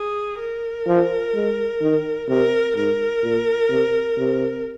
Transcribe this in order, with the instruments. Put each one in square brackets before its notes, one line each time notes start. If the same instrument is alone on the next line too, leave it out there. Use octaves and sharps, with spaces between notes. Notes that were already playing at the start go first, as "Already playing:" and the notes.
Already playing: [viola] G#4
A#4
[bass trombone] F3
G#3
D#3
[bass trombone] C3 [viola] A#4
[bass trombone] G#2 [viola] A#4
[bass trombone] A#2
C3
C3